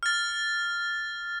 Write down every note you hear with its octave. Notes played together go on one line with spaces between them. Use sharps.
F6 A6